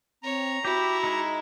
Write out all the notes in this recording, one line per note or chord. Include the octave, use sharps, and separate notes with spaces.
C4 C#5 A#5
E4 F#4 G4
G#3 D#4